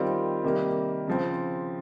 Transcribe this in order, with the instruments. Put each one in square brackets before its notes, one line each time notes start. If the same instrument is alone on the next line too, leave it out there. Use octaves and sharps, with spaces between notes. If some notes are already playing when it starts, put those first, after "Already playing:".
Already playing: [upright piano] D#3 G3 C4 F4
C3 D#3 G3 A#3
C#3 F3 C4